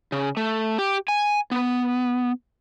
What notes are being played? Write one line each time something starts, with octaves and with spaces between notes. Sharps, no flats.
C#3
A3
G4
G#5
B3